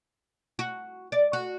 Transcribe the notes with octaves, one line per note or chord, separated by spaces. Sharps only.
F#4
D5
F#4